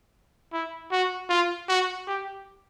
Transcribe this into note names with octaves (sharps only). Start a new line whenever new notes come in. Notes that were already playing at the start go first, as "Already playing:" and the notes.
E4
F#4
F4
F#4
G4